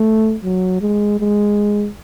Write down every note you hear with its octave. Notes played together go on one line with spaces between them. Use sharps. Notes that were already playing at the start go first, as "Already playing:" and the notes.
Already playing: A3
F#3
G#3
G#3